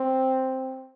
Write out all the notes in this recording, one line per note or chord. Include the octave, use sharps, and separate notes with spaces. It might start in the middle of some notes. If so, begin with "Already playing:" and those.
Already playing: C4